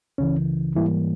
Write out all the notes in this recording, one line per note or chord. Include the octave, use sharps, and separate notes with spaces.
C#2 C#3 E3 C#4
G#2 E3 G3 A#3 E4